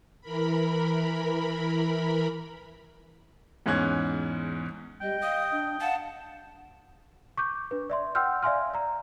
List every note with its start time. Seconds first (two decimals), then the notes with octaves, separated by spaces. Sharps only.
0.21 E3 A#4 B5
3.66 E2 G#2 C#4 F#6 G#6
5.01 G3 D#5 G5
5.22 F5 D#6
5.52 D4
5.80 F5 F#5 A5
7.37 C#6 D6 G6
7.71 D4 B4
7.90 D5 E5 C6
8.15 F#5 G5 C6 E6 F6 G6
8.43 D5 E5 F5 G#5 C6 F6
8.74 D5 A#5